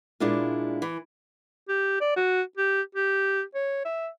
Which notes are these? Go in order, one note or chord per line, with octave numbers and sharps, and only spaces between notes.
A#2 G#3 D4 E4 F4
E3
G4
D5
F#4
G4
G4
C#5
E5